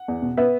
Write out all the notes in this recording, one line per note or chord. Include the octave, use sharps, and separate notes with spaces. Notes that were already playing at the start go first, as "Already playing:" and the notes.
Already playing: F#5
E2
B2
B3 B4 E5